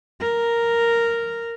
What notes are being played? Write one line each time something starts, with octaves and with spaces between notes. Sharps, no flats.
A#4